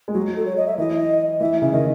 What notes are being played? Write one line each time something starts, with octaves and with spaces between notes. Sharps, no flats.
G#3
F#3 F#4
F#4
A4
C#5
D#5
E5
E3 D#5
E3 E5
C#3 E5
D#3 D#5